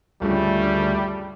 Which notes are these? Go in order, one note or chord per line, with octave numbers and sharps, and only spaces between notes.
D2 G2 C#3 F3 G3 A3